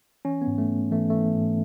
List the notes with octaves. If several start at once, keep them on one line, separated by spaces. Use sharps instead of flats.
E3 C#4
B3
G#2
A3
G#2
E3 A3
E3 A3
G#2